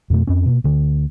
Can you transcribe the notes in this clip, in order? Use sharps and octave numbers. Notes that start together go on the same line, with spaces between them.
F2 B2 A3
F2 C4 C#4
B2 A#3
D2 D3